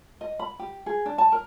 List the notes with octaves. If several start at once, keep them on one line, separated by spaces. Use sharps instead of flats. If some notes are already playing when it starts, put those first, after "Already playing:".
D#5
B5
G4
G#4
D4
A5
A#4